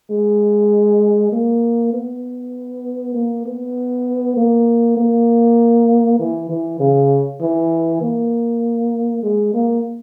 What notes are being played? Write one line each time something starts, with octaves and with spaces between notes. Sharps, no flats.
G#3
A#3
B3
A#3
B3
A#3
A#3
E3
E3
C#3
E3
A#3
G#3
A#3